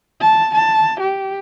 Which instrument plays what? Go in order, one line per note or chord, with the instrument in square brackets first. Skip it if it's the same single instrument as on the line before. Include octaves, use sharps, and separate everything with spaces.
[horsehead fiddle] A5
A5
G4